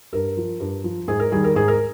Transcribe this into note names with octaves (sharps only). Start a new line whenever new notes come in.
G2 A#4
F3
G2
F3
G#2 G#4
A#4
D#3 G3 G#4
A#4
G#2 G#4
A#4